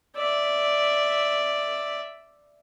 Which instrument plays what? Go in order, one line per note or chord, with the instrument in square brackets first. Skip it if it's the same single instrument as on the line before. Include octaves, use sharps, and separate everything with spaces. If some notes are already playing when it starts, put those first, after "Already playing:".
[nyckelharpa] D5 E5